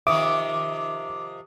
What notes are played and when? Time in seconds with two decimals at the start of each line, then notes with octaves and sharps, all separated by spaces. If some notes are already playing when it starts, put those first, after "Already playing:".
0.07 C3 D#3 F3 E5 D6 D#6